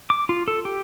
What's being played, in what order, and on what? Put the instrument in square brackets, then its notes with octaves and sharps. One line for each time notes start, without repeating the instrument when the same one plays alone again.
[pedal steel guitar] D6
F4
A4
G4